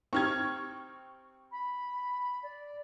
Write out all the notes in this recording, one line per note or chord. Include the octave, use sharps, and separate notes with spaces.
C4 D#4 G4 C#6 F6 G#6
B5
D5